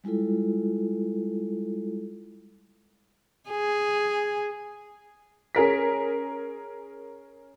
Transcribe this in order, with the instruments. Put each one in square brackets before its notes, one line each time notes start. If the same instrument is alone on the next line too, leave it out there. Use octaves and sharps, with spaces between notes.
[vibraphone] G3 G#3 E4 F4 A4
[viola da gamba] G#4
[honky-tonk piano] C#4 G#4 A#4 B6